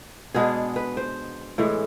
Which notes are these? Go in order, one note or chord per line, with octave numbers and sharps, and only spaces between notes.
B2 G#3 B3 D4 G#4
B4
C5
A2 E3 G#3